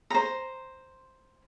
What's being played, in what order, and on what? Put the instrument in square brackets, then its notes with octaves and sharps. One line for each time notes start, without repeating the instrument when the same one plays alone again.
[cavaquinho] C5 A#5